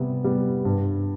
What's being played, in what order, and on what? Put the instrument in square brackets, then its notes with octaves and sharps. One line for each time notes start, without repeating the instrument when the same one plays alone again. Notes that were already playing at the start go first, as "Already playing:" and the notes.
Already playing: [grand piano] C3 G3 B3
G3 B3
G2